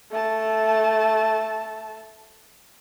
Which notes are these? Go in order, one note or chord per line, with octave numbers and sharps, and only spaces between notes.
A3 A5